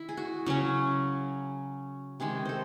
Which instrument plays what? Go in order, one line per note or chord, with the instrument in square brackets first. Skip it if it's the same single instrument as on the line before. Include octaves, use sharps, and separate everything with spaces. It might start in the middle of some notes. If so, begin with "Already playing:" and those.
Already playing: [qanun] D#3 E4
G#4
F#4
C#3 F#3 C#4
C3 D#3 G#3 G#4
A4 C5